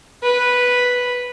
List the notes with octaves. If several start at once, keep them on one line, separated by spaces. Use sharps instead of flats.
B4